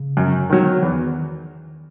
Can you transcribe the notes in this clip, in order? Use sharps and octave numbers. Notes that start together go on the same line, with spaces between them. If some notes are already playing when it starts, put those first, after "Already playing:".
Already playing: C#3
F#2
D#3 F#3
E2 D#3